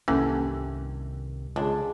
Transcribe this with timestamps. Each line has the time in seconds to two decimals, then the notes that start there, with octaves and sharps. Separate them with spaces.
0.08 C2 G2 D#3 E3 A#3 C#4 A4
1.56 C#2 G#3 D4